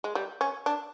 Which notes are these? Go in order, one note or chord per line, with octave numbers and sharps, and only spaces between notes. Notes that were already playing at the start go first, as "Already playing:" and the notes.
G#3
G3
C#4
D4